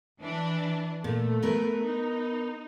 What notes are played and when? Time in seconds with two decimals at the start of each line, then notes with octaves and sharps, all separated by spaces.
0.21 E3 D4
1.04 A#2 A3
1.42 B3 A#4 B4
1.86 D#4